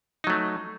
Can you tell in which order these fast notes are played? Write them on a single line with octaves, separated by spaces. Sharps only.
D#4 F#3 A3